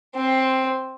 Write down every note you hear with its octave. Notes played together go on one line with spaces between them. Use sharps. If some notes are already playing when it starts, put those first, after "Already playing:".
C4